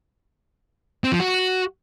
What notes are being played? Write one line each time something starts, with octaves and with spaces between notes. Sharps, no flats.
C4
F3
F#4